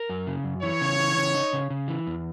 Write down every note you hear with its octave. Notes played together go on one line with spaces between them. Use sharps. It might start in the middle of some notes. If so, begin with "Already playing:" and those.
Already playing: A#4
F#2
C#3
F#2
E3 C#5
C#3
E3
C#3
D#4
C#3
C#3
E3
E2